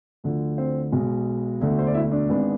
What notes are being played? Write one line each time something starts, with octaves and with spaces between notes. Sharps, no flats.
D2 D3 F3
C4 C5
B1 B2 G#3
E1 D2 D3 A3
C5
D5
E4 E5
D4 D5
G#1 G#2 G#3 B3 D4